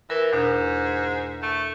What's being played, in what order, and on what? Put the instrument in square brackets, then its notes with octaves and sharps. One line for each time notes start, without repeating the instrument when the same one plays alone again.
[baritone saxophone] E3 [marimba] A#4
[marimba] E2 B2 D4 [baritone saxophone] G#2
[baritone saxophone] A3